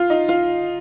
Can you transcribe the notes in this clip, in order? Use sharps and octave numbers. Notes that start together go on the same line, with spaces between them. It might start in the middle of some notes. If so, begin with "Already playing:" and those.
Already playing: F4
D#4
F4